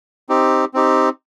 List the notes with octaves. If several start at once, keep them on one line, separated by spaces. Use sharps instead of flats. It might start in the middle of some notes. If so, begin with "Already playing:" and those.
C4 D#4 G4
C4 D#4 G4